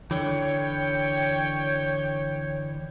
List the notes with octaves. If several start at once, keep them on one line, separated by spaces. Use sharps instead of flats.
D3 E3 C#5 G5